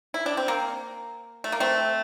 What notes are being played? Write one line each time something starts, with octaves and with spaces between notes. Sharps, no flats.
E4
D4
C4
A#3
A3
A#3
A3 C4